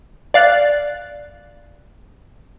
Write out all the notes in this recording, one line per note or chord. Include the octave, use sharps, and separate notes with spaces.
D5 F5 F#6 A6